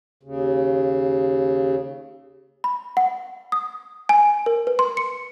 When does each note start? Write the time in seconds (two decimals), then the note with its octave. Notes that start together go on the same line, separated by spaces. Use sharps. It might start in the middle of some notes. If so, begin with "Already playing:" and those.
0.23 D#2 C#3
2.64 B5
2.97 F#5
3.52 D#6
4.09 G#5
4.46 A#4
4.67 B4
4.79 C6
4.97 C#7